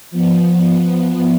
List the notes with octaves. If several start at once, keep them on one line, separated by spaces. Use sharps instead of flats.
F3 B3